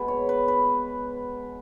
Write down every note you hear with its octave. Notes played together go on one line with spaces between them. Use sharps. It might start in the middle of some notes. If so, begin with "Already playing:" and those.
Already playing: B2 G#3 B4
C#5
B4
B4